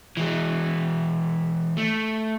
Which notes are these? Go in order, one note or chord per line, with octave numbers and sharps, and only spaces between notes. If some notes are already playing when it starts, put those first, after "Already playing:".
E3 G#3
A3